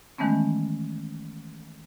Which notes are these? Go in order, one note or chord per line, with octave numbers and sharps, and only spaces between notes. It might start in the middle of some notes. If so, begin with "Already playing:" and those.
D#3 E3 G#3 A3 B3 C#4